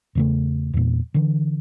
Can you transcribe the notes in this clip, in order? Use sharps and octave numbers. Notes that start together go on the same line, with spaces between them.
E2 C#3 A3
E2 A#2
D3 E3